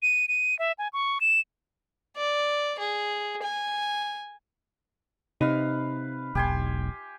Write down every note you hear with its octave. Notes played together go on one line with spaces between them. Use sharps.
D#7
D#7
E5
G#5
C#6
E7
D5
G#4
G#5
C3 D#4 B4 F5
E1 B1 G4 G#5 C6